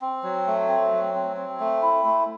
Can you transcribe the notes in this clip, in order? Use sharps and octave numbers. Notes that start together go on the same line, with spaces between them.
C4
F#3
A3
C4
F#3
C4
C4
A3
E4
A3